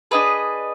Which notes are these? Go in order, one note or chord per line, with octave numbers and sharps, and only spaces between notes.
D4 G#4 B4 D#5